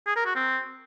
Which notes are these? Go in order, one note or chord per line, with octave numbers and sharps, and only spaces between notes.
G#4
A#4
F#4
C4